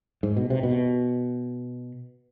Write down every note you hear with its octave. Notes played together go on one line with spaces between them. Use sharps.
G#2
B2
C3
B2